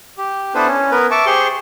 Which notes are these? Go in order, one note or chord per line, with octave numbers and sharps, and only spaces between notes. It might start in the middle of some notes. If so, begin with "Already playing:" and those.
G4
B3 D4 E4 A4 B4 C5
C#4
B3 A#4 B4
E5 A5 C#6 D6
G4 G#4 C5 C6 C#6